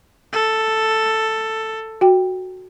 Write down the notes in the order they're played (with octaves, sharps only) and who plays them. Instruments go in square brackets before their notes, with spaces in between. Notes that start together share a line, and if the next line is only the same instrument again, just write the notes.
[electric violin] A4
[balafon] F#4 G5